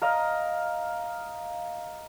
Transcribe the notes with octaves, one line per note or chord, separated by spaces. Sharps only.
A#4 D#5 F5